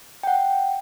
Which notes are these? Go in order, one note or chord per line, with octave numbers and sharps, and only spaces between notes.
F#5 G5